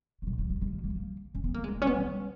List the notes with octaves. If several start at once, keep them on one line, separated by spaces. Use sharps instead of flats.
C#3
B2
D#3
F#3
G#3
A#3
A#3
A#3
C#4
B3
A#3
G#3
B3
C#4
B3
B3